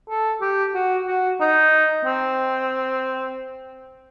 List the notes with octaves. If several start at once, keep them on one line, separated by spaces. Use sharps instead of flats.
A4
G4
F#4
F#4
D#4
C4